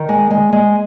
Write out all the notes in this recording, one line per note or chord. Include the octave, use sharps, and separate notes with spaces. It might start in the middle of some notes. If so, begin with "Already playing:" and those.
Already playing: D#3
G#3
G#3
G#3